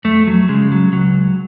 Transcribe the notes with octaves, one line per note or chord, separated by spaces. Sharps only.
F2 A3
F#3
C#3 G#3
F#3
C#2 F#3